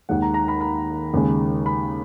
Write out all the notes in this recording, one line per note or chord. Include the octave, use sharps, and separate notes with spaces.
D#2 D#3 G#3 F#5
A#5
A#5
B5
B5
D#2 C#3 G#3
B5